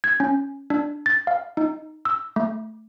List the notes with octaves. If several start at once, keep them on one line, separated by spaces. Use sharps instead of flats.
G#6
C#4
D4
A6
F5
D#4
E6
A3